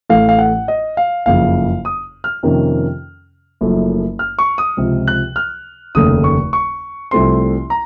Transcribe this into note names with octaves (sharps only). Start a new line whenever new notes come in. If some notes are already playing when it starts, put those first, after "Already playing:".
A1 A2 A3 F5
F5
F#5
D#5
F5
F#1 F2 C#3 F5
D#6
F6
F2 C3 D#3 A#3 C#4
F#1 F#2 F3 A3
F6
C#6
D#6
C#2 C3 F3
F#6
F6
F1 D#2 C#3 A3 D#6
C#6
C#6
C2 C3 F3 A3 C4 C6
A#5